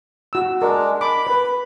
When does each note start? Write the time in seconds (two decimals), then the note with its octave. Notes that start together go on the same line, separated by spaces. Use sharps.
0.33 F#4 E6
0.62 G#3 D4 A#4
1.01 B5 D6
1.27 B4